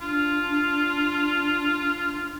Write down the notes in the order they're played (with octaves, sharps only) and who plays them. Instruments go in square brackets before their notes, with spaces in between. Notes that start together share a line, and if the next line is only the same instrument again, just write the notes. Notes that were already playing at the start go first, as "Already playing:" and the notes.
[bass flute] D4 [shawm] F4